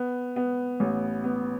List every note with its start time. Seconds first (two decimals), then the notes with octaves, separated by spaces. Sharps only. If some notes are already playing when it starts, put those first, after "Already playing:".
Already playing: B3
0.36 B3
0.80 A1
1.24 B3